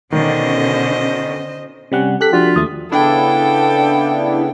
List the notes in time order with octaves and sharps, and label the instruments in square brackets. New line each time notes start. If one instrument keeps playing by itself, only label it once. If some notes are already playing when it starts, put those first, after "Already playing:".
[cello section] B2 D3 C#4 [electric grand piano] D#3 [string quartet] C5 D#5
[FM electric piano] C3 G3 F#5 [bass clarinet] C#4
[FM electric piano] G4 F#6 B6 [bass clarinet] A4
[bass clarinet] F3 [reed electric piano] D4 F#4 [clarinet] F4
[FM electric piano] D#2 A3 [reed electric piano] D#6
[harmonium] C#3 B3 [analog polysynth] D4 E4 [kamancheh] A4 G5